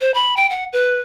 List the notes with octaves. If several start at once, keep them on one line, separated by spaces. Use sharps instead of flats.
C5
B5
G5
F#5
B4